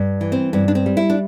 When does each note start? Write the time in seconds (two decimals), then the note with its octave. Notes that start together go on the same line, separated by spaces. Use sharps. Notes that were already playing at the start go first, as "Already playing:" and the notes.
Already playing: G2
0.21 E3
0.32 C4
0.53 G2 C4
0.68 D4
0.75 C4
0.86 G3
0.97 E4
1.10 D4